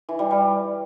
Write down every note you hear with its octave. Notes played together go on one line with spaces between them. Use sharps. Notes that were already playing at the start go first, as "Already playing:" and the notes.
E3
G3
G3